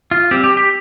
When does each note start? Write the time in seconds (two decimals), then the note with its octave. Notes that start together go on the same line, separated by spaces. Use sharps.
0.11 F4
0.31 G3 C4 G4
0.44 G4
0.57 G4